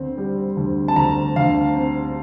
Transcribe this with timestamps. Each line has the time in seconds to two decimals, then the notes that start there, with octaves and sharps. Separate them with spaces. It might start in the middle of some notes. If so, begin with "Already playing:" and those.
Already playing: D2 D3 C4
0.18 G3
0.57 D2
0.88 A5
0.96 D2 A#5
1.36 D2 F5
1.75 C4